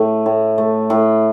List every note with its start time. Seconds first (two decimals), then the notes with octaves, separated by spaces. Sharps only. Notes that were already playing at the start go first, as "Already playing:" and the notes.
Already playing: A2 A3
0.26 A2
0.58 A3
0.90 A2